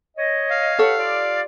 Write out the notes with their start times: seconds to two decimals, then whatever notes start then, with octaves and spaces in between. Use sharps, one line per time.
0.17 C#5 D#5
0.50 F5
0.79 G4 A4 B4 C#5 F#5
0.98 F4 G4 D5